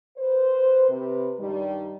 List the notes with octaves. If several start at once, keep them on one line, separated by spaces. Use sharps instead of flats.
B4 C5
C3 B4
G2 D#3 G3